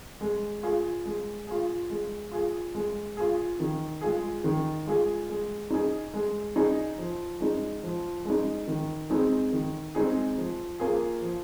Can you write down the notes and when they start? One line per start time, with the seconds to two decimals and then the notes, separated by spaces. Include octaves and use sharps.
0.21 G#3
0.63 F4 G#4
1.05 G#3
1.47 F4 G#4
1.90 G#3
2.31 F4 G#4
2.75 G#3
3.17 F4 G#4
3.60 D#3
4.01 G#3 F4 G#4
4.44 D#3
4.86 G#3 F4 G#4
5.29 G#3
5.70 D#4 G#4
6.14 G#3
6.56 D#4 G#4
6.98 F3
7.40 G#3 D#4
7.83 F3
8.25 G#3 D#4
8.67 D#3
9.10 G#3 C4 D#4 G#4
9.52 D#3
9.95 G#3 C4 D#4 G#4
10.37 F3
10.80 A#3 F4 G#4
11.21 F3